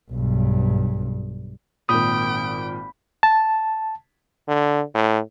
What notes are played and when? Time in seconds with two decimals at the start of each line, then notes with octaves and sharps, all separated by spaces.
0.11 B1 G2
1.89 G#1 A#2 G5 B5 D#6 B6 D7
3.23 A5
4.48 D3
4.94 A2